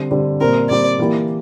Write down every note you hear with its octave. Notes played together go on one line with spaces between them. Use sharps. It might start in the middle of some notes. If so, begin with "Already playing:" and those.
Already playing: D3 G3 C4
D3 G3 C4
A#2 G3 C4 A#4
A#2 G3 C4 D5
E3 A#3 E4 G4